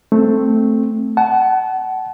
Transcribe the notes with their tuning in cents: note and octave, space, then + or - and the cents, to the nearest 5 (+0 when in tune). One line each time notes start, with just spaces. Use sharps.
A3 +0 C4 +0
F#5 +25 A5 -30